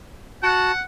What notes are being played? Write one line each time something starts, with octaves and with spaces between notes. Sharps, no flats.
F#4 F#5 A5